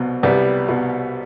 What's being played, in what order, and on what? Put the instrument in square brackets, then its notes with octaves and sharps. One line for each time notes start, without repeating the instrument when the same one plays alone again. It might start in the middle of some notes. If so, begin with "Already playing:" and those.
Already playing: [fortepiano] C2 B2
C2 G3 B3
B2